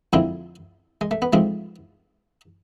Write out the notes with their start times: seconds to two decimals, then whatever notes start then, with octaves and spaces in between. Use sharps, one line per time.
0.13 F2 D3 F3 G#3 C4 E4
1.01 G#3
1.11 A3
1.22 B3
1.33 G#2 F3 G#3 A3 C4